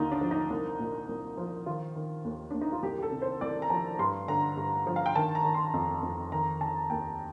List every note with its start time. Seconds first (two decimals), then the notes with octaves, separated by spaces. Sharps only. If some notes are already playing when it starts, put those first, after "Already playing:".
Already playing: D#2 D3 D#4 F4
0.12 D4
0.21 F3
0.31 D#4
0.50 C2
0.79 A#2
1.09 C2
1.37 F3
1.66 D#3 F4
1.96 D#3
2.25 D#2
2.51 D#2 D4
2.61 D#4
2.72 F4
2.83 C2 G4
2.98 G4
3.03 A4
3.12 C3
3.22 C5
3.41 C2 D5
3.62 A#5
3.70 F3 A5
3.99 G2 C6
4.28 D3 A#5
4.57 G2
4.87 F3
4.96 F5
5.06 G5
5.16 D#3 A5
5.35 A#5
5.45 D#3
5.54 C6
5.74 F2
6.02 F2
6.32 D#3 A#5
6.61 D#3 A5
6.90 D#2 G5